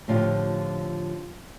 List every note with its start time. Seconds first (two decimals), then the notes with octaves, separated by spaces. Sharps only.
0.08 A2 D3 F3 F4 G4